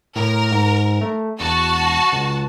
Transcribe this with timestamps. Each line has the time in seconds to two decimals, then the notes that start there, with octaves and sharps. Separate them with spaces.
0.15 A2 A#4
0.51 G#2
1.01 A3
1.40 E1 F#4 A5
2.12 C#2